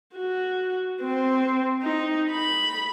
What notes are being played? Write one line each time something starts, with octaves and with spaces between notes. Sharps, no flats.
F#4
C4
D#4
B5